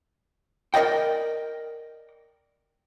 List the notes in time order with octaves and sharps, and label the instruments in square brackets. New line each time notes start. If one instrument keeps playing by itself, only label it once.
[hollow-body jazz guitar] A#4 B4 D5 D#5 G5